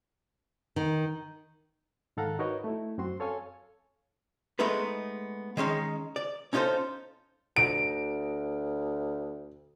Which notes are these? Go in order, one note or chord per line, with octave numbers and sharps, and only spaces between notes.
D#3
G#2 D#3 A4 F5 F#5 A#5
D#4 F#4 A#4 B4 C#5 D#5
A3 E4
F#2 C4 F#4 C6
A4 C#5 F5 G#5
G#3 A3 B3 D#4 B4
D#3 G#3 C#4 D#4
D5
C#4 D#4 F4 G4 A4 C5
D2 D7